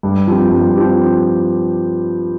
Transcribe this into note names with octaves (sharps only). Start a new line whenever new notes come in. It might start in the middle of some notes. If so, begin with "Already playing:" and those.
G2
F3 C4 G4
G2
F3 C4 G4